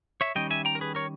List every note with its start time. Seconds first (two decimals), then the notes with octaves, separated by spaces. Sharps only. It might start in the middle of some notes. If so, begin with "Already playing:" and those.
0.21 C#5 E5
0.35 D#3 G3 C#4 D#5 G5
0.50 E5 G#5
0.65 G5 A#5
0.75 A#4
0.81 G#4 B4
0.95 A#4 C#5